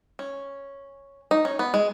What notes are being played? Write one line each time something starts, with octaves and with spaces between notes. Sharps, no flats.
C#4
D#4
C#4
B3
G#3